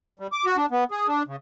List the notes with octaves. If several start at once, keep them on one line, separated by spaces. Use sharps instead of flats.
G3
D6
F#4
D4
B3
G#4
D4
C#3